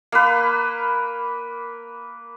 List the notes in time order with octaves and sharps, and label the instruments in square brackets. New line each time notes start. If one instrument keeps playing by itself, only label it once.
[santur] A#3 B4